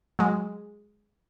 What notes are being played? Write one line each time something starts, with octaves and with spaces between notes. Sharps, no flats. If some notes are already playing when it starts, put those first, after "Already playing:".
F#3 G#3